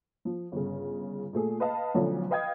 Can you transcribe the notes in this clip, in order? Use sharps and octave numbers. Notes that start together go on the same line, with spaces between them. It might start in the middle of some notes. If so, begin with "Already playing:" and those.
F3
G1 C#3
A#2 A3 G#4 A4
B4 D#5 F5 A5
B1 D3 F3 A3 C#4
B4 D#5 F5 G5 D#6 G#6